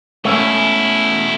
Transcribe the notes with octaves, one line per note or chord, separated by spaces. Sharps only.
B2 A3 C#4 E4